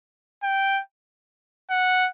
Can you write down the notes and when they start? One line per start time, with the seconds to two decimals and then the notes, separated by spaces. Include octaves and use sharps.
0.43 G5
1.71 F#5